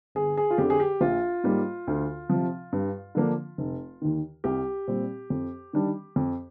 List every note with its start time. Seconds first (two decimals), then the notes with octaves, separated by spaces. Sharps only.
0.15 G1 G#4
0.37 G#4
0.50 F4
0.58 F2 D3 G4
0.70 G#4
0.80 G4
1.01 A#1 F4
1.44 G#2 G3 A#3
1.87 D2
2.30 C3 F3
2.73 G2
3.15 D3 F3 A#3 D4
3.58 F1
4.02 D#2 D#3
4.44 C2 G4
4.88 A#2 G3 C4
5.30 F2
5.73 D#3 G3 D4
6.16 F2